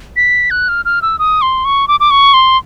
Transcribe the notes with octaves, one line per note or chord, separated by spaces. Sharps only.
B6
F#6
F6
F6
E6
D#6
C6
C#6
D6
D6
C#6
C6